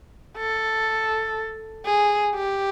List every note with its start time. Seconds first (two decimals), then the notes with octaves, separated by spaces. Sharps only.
0.38 A4
1.85 G#4
2.35 G4